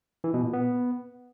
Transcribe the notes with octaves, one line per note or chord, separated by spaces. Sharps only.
E3
B2
A#2
B3